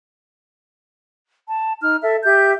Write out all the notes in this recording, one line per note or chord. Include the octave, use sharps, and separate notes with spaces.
A5
D#4 F6
A4 E5
G4 E5 G6